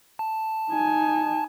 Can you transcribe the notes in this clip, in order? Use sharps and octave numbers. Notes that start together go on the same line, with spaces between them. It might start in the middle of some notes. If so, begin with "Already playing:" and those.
A5
D#4 G#5